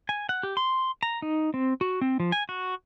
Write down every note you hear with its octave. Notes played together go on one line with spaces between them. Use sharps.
G#5
F#5
G4
C6
A#5
D#4
C4
F#4
C4
F3
G#5
F#4